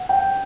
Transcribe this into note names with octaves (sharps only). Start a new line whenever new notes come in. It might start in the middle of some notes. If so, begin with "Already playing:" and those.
Already playing: F#5
G5